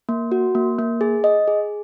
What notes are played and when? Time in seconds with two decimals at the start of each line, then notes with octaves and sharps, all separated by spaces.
0.09 A#3
0.32 F#4
0.55 A#3
0.79 A#3
1.01 G#4
1.24 D#5
1.48 G#4